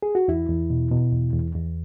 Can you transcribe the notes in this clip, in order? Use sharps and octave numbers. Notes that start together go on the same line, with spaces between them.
G#4
F#4
E2 E4
E2
B2
B2
E2
E2
E2